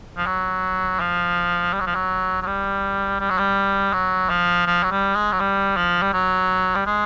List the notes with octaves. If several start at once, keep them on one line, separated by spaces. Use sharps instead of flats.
F3
F#3
F3
G3
F#3
F3
F#3
F#3
G3
G3
F#3
G3
F#3
F3
F3
F#3
G3
G#3
F#3
G3
F3
G3
F#3
G3
G#3